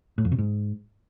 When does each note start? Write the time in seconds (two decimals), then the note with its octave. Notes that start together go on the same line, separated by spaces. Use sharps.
0.18 A2
0.25 F2
0.32 C3
0.38 G#2